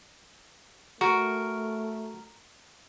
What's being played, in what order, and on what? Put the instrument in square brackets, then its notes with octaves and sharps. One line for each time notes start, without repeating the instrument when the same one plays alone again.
[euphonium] A3 [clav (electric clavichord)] F#4 [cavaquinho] A#4